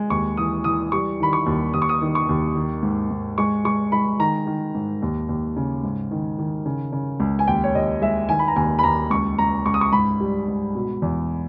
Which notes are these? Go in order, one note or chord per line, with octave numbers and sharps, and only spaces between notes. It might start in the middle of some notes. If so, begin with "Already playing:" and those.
Already playing: G#3
D#2 C#6
E3 D#6
E3 D#6
G3 C#6
D#3 B5
C#6
D#2
D#2 D#6
C#6
D#6
D#3
C#6
D#2
D#3
G#2
G#2
G#3 C#6
G#3 C#6
G#3 B5
D#3 A#5
D#3
G#2
D#2
D#2
C#3
G#2
D#3
D#3
C#3
C#3
C#2
G#5
D#2 G5
C#5
D#2 D#5
G#3 E5
D#3 G#5
B5
A#5
D#2 G#5
B5
D#2 A#5
C#2 C#6
C#2 A#5
C#2 C#6
D#6
C#6
G#2 B5
G3
G#2
B2
E2